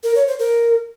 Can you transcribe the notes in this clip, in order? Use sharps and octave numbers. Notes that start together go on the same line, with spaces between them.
A#4
C#5
C5
A#4